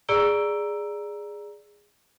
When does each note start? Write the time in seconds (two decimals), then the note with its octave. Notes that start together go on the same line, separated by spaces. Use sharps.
0.09 G#4 D5 A#5 E6 D7 G7